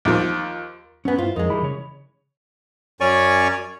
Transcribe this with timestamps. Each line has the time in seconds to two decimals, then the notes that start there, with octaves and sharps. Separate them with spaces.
0.05 D#2 F3
1.05 F#2 B3 C#4 G#5
1.18 G2 E4 F4 C5
1.36 F2 G#3 D#4 A#4
1.50 E3 F3 G3 E4 B5
1.62 C#3 C#5
3.01 F#2 C#4 C#5 D5 G#5 C#6